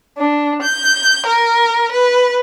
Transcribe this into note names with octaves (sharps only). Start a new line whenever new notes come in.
D4
G6
A#4
B4